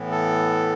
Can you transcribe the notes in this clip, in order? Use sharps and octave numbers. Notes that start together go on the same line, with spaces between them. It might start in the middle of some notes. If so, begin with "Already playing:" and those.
Already playing: A2 E3 B3
A4